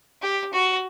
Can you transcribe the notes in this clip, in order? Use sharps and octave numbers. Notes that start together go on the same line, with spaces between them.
G4
F#4